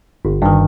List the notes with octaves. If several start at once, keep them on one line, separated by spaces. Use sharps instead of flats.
G1
G2 D#3